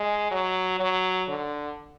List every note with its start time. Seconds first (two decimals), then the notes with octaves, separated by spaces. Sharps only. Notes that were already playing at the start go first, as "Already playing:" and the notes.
Already playing: G#3
0.31 F#3
0.80 F#3
1.28 D3